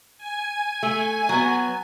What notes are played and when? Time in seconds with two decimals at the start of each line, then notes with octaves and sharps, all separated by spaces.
0.18 G#5
0.83 A3
1.29 F#3 B3